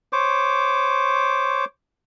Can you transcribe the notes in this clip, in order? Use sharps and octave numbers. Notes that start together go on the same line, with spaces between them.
C5 C#5 D6